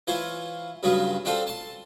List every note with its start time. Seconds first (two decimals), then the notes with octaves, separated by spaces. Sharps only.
0.07 E3 F4 C5 C#5
0.83 G2 C#3 F#3 B3 F4
1.25 C4 D4 F4 A4 C5
1.47 A5 C6